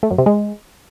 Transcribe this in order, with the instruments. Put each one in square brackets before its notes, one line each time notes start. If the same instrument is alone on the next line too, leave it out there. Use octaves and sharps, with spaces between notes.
[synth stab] A3
F#2
C3
G#3